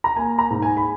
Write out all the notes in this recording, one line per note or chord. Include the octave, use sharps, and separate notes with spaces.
A#5
A#3 G#5
A#5
G#2
G#5
B5